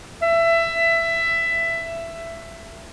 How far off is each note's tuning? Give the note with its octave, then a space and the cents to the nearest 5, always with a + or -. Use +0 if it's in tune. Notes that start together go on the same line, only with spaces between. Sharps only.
E5 +15